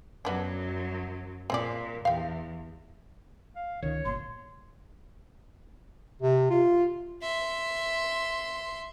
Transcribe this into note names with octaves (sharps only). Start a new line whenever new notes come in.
F#2 F#3 G3 B3 D4
A#2 C4 G#4 D5
E2 G4 F5
F5
C#2 D#3 C#5
G1 A#2 C6
C3
F4
E5 C6